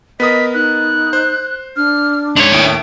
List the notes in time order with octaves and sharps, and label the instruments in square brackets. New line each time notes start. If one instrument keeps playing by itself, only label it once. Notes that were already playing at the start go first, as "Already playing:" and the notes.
[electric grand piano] B3 A#4 D#6 [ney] D#5 [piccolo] B6
[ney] D#4 [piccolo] F#6
[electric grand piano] C5
[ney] D4 [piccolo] F6
[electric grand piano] G#2 [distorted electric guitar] D4 C#5 [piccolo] F7
[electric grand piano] D#2 A2 [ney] E5 [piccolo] D7